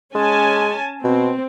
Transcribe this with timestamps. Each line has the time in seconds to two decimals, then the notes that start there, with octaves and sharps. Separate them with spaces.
0.15 G#3 C#4 G#5 A5
1.04 B2 C4